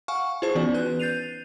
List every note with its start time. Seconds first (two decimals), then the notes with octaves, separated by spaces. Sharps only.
0.08 F5 F#5 G#5 C#6 F6
0.42 E4 F4 G#4 C5 A5 C#6
0.55 E3 B3 C#4 D#4 F#4 D5
0.74 B4 F#6
1.00 G6 A6 C7 D#7 F7